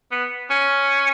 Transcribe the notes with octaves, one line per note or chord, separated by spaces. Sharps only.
B3
C#4